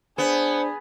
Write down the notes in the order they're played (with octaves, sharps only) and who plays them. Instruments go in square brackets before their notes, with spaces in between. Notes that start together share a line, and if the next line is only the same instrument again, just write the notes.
[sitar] B3 [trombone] D4 [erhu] G#4 [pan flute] C5